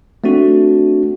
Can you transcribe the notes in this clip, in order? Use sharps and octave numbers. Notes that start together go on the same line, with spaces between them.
A3 C4 D4 F#4